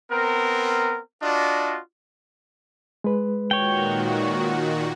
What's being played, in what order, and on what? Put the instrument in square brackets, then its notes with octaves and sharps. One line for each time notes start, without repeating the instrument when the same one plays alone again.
[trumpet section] B3 C4 A#4
D4 F4 F#4 D5 D#5
[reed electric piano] G#3 B4
[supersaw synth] A#2 D#3 F#4 [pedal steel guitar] C#5 G5